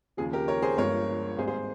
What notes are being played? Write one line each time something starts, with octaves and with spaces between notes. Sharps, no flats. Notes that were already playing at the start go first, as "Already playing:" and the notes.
D#2 C#3 F3 G#4
G4 A#4
A#4 C#5
G#4 C5
G1 G2 F3 G#3 A#4 C#5
G#1 G#2 G3 A#3 G#4 C5
G#4 C5